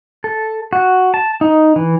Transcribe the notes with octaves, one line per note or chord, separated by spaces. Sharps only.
A4
F#4
A5
D#4
E3